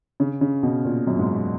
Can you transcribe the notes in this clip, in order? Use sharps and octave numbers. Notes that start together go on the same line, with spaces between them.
C#3
C#3
B2
A#2
F#2
G#2